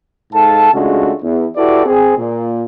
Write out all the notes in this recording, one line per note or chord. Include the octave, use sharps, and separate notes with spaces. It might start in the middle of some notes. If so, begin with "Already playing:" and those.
G#2 A4 F5 A5
C#3 G#3 A3 D4 F4 F#4
E2
E4 F#4 G4 A4 B4 D5
C4 G#4
A#2